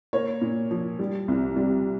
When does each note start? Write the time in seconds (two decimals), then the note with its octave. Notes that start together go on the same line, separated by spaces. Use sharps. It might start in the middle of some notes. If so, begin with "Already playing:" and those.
0.13 A#3 C#5
0.41 A#2
0.71 F3
0.99 G3
1.28 C2
1.56 G3